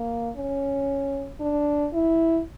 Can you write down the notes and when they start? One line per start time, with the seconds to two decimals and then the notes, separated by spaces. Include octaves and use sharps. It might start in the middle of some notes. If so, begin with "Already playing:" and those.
Already playing: A#3
0.36 C#4
1.40 D4
1.93 E4